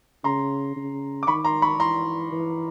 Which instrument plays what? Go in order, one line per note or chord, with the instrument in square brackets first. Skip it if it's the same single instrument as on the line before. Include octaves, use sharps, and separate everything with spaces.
[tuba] C#3 [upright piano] A#5 C6
[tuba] C#3
[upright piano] D6
[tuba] D#3 [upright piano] B5 C#6
[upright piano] A#5 C6
B5 C#6
[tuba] E3 [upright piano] A#5 C6
[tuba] E3